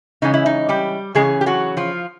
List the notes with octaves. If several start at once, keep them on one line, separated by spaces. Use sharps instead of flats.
C#3 E3 G#3 C#4 D#4
E4
D#4
G3 G4
C#3 E3 G#3 C#4 G#4
G4
F#3 F#4
F3 F4